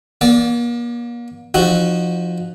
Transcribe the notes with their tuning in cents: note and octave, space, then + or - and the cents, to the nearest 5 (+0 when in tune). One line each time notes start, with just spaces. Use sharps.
A#3 +40 D5 -20
F3 +5 D#4 -30 F#4 +0